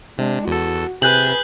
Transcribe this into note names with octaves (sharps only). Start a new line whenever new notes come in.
C3 G#3 D4
E2 F#4 A4
C3 G#4 B4 F#6 G6 F#7